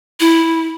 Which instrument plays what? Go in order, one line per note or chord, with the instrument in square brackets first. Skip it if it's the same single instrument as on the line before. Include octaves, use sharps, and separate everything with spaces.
[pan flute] E4